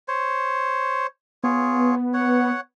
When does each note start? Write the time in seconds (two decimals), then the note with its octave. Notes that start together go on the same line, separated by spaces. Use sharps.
0.08 C5 C#5
1.44 B3 F4 G#4 C#5
2.14 C#5 F#5